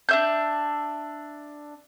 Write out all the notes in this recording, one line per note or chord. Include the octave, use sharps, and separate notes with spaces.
D4 E5 G6